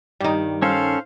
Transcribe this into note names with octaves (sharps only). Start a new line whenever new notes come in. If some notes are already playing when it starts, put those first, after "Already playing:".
G2 D#3 G3 D#4
C#4 A4 C5 F5